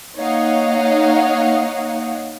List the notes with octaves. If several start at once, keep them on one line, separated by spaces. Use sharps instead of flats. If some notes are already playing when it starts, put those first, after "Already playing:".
A#3 D#4 C#5 D#5 F5 F#5